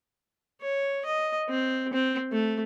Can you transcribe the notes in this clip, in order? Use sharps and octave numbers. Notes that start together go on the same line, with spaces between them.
C#5
D#5
C4
C4
A3